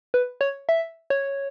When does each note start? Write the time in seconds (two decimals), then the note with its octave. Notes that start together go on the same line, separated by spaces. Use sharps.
0.14 B4
0.41 C#5
0.69 E5
1.10 C#5